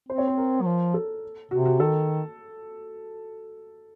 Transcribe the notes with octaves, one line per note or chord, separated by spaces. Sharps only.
C4 C5
C#5
C5
A#4
F#3
F3
A4
C3 F#4
F#4
D#3 A4